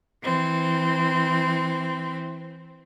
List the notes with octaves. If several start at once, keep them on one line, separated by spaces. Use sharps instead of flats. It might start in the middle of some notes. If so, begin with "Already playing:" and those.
E3 C4